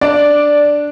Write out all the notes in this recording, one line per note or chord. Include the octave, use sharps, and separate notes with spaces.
D4 D5